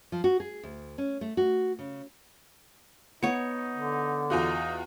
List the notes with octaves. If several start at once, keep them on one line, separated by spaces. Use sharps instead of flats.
F3
F#4
G#4
D2
C#4
A3
F#4
C#3
B3 D#4 C#5 C#7
D3
E2 D#4 F4 F#4